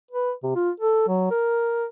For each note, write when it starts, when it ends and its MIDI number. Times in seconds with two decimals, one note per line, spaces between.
0.11 0.32 71
0.43 0.51 48
0.55 0.70 65
0.80 1.06 69
1.08 1.28 54
1.31 1.85 70